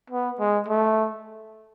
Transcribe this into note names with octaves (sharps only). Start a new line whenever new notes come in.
B3
G#3
A3